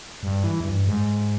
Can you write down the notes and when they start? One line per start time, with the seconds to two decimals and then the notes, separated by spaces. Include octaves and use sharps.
0.23 G2
0.44 E3
0.61 E2
0.65 G2
0.87 G#2